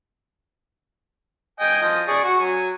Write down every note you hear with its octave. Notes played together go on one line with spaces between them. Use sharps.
D#5 G5 G#5
F3 D#5
G#4 D5 C#6
F#4 C#6
F#3 G#5